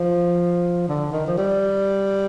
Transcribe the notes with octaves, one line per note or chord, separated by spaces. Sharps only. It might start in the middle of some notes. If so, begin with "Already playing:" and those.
Already playing: F3
D3
D#3
F3
G3